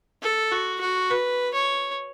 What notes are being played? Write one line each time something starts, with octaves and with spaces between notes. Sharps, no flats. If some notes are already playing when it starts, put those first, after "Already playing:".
A4
F#4
F#4
B4
C#5